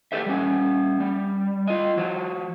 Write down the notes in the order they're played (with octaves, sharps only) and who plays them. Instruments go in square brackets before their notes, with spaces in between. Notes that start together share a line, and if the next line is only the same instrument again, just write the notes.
[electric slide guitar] G4 A4 B4 E5
G3 C#4
G3
F4 D#5
F3 F#4